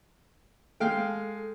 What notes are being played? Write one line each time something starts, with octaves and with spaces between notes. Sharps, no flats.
G#3 A4 F5 G5